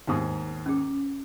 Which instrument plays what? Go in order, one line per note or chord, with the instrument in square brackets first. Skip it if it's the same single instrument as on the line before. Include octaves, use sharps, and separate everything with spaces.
[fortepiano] D#2 G#2 D#6
[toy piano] C#4 G#4